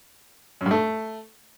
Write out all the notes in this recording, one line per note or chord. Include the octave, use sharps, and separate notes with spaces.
F#2
G2
A3